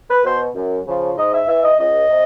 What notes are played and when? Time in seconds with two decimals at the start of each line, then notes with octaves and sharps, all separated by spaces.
0.09 B4
0.24 B2 C5
0.55 F#2
0.87 C#3 F3
1.17 G#2 D#5
1.33 E5
1.48 E3 E5
1.63 D#5
1.79 C#2 D#5
2.10 C3